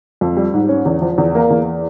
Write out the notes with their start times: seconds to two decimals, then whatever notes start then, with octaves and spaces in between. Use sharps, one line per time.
0.21 F2
0.37 G3
0.54 G#2
0.69 C#4
0.85 E2
1.02 F3
1.18 E2
1.35 A#3
1.50 E2